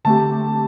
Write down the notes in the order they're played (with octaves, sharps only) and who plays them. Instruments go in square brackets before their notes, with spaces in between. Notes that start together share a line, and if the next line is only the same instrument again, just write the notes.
[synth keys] D3 A3 C4 G4 [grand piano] A5